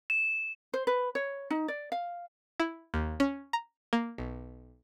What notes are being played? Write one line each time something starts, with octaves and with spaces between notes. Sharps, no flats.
E7
C5
B4
C#5
D#4
D5
F5
E4
D#2
C#4
A#5
A#3
B1